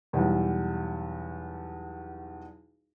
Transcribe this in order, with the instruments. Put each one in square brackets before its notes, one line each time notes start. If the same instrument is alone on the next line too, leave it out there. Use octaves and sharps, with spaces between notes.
[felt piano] B1 E2 G3